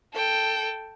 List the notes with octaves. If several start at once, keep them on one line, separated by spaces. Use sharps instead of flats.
A4 G5